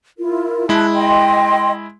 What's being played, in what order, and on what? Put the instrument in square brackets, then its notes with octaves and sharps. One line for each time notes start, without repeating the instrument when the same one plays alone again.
[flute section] E4 F4 A#4
[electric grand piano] G#3 E4 [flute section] A5 F#6
[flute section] D#5 G5 C6